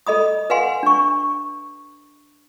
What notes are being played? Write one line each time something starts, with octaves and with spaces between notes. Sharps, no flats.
A4 D#5 B5 D#6
B4 F5 F#5 G#5 C6
D4 C#6